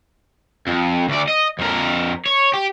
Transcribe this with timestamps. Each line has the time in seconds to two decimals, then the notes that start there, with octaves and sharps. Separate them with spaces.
0.67 F2
1.09 D2 D5
1.28 D#5
1.59 F2 A#4
2.26 C#5
2.54 G4